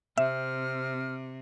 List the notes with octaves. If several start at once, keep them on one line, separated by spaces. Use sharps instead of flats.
C3 C4 E5 F6